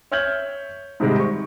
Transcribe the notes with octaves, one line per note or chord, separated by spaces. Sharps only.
C#5 E5 F6 G6 G#6 F#7
G#2 C3 D#3 G3 G#3 D#4
C#6